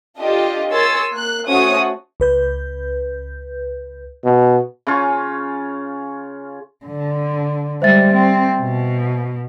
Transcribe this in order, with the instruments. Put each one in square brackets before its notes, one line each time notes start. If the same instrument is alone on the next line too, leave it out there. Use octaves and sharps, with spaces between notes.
[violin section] D4 F4 G4 A4 D#5
G#4 A#4 C#5 C6 E6 A6
A#3 F#6
A3 C#4 F#4 C5 C#5 D#6
[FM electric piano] C#2 B4 G6
[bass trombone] B2
[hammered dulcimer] C#3 C#4 F4 C#6
[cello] D3
[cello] G3 G#3 [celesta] C5 E5 A6
[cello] C4
B2